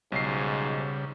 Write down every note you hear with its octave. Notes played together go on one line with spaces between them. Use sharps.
B1 G#2 C#3 G3 C7